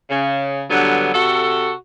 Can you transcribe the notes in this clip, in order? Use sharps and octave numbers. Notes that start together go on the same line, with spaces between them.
C#3
G2 D3 F#3 B3
C3 F#4 A4